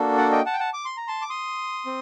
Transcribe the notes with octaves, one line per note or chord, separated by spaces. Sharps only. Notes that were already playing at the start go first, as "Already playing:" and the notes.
Already playing: A#3 D4 F#4 A4
D5 F#5
D#5 G5
F#5 A5
G5
F#5 A5
D6
C6
A#5
A5 C6
D6
C6 D#6
C4